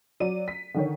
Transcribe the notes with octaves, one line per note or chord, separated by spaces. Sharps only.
F#3 D5 D#7
B6
D3 D#3 C#5